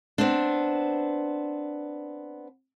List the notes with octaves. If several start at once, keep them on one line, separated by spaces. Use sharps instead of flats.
B3 C4 D4